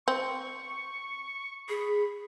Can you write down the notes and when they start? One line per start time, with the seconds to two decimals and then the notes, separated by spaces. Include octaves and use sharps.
0.08 C4 C#6
1.69 G#4 B5